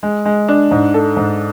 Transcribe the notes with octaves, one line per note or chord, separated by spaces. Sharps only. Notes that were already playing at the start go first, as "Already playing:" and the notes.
G#3
G#3
D4
G#2
A4
G#2